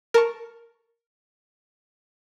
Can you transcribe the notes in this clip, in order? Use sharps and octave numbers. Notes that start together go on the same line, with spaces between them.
A#4 A5 C#6